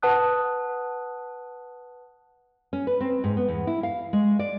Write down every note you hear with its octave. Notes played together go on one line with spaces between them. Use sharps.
B4 F#5 A5 D#6 F#6
C#4
B4
C4
G#2
B3
E2
E4
F5
G#3
D5